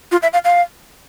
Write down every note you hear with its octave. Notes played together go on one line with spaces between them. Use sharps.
F4
E5
F5
F5